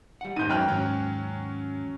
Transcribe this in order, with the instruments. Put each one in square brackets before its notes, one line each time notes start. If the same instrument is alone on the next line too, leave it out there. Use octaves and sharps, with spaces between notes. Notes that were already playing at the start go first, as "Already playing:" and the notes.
[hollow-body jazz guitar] G3 F#5
[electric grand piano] D#2 G#2 [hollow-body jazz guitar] D#4 [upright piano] G6 D#7
[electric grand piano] F#2 F#3 [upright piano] G5 F6 F#6
[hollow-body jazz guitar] D#2 G#2 [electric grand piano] F#3 C#4